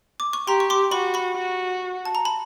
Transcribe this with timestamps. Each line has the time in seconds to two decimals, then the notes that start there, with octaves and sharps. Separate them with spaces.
0.20 D6
0.33 C#6
0.47 G4 A#5 C6
0.60 C#6
0.70 C6 D6
0.91 F#4 B5 C#6
1.14 B5 C#6
1.36 F#4
2.05 A5
2.15 A#5
2.25 A5 B5